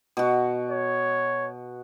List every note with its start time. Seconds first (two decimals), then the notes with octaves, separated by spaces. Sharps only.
0.17 B2 F#4
0.71 C#5